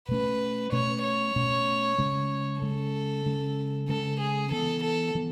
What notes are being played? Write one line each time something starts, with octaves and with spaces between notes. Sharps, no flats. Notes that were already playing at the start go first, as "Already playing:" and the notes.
B2 A3 C#4 B4
B2 A3 C#4 C#5
C#5
B2 A3 C#4
C#3 G#3 C#4
C#3 G#3 C#4 A4
C#3 G#3 C#4
C#3 G#3 C#4 A4
G#4
E3 B3 A4
A4
E3 B3